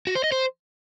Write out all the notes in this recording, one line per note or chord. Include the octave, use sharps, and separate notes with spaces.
F#4
C5
D#5
C5